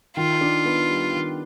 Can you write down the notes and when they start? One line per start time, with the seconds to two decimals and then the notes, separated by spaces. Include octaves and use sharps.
0.17 D#3 F4
0.41 D4
0.65 B3
0.89 G3
1.13 D#3